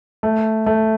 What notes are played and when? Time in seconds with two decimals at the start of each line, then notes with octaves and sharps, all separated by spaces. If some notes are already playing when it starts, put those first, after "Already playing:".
0.23 A3
0.66 A3